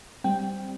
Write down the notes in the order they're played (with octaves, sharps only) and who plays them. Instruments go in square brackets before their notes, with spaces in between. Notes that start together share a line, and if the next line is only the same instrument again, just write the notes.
[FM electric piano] G3 C4 G5